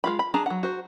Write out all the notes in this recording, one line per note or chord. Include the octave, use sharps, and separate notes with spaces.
G#3 F4 B5
B5
D4 G#4 A5 A#5
F#3 F#5
F#4 C5